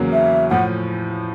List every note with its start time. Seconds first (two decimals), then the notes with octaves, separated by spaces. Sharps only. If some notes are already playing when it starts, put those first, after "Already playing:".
Already playing: E2 C#3 F#3 A#3
0.13 E5
0.50 A2 F3 F#5